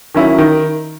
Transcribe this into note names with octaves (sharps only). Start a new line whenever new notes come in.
D#3 F#3 C#4 E4
D#3